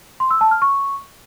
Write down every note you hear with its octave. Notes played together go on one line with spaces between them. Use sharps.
C6
E6
A5
F6
C#6